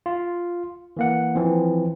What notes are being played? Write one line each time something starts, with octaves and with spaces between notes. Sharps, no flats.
F4
E3 A#3 F#5
E3 F3 C4